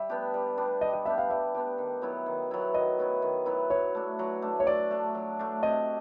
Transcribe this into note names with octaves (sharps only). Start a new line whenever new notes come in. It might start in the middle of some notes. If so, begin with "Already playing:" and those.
Already playing: G3 E5
B3 D4 G4
G3
B3 D4 G4
G3 D#5
D#5
B3 D4 G4 E5
F5
G3 E5
B3 D4 G4
D#3
F#3 B3 E4
D#3
F#3 B3 E4
D#3 D#5
F#3 B3 E4
D#3
F#3 B3 E4
F#3 C#5
A3 D4
F#3
A3 D4
C#5
F#3 D5
A3 D4
F#3
A3 D4
C3 D#5